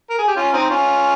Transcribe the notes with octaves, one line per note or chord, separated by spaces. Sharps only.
A#4
G#4
G4
C#4 F4
C4 D#4
C#4 F4